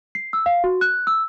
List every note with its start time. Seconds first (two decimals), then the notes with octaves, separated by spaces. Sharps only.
0.15 C7
0.33 E6
0.46 F5
0.64 F#4
0.81 F#6
1.07 E6